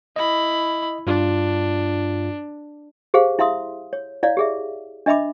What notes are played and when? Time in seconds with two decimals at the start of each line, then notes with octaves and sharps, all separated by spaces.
0.16 E4 D#5 B5
1.07 G2 D4 F4
3.14 G4 G#4 C5 F5
3.39 E4 E5 F5 C6 D#6
3.93 C#5
4.23 E4 C#5 D5 F5
4.37 G4 G#4 E5
5.06 D4 D#5 E5 B5 D6